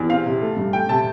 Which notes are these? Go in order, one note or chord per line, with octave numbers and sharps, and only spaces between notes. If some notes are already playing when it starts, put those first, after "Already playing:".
Already playing: E2
C4 F5
C3
A3
G2
A3 G5
C3 A5